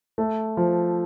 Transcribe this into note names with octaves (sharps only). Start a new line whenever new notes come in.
A3
F3